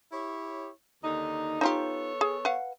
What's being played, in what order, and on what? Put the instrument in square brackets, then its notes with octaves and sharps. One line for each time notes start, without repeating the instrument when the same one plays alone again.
[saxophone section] E4 G4 C#5
D#2 D3 D#4
[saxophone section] B3 A4 C#5 [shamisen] D#4 F4 G4
[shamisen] G#4
B4 F5 F#5